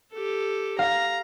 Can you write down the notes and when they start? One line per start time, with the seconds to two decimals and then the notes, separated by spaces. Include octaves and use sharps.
0.13 G4 A4
0.79 F5 A#5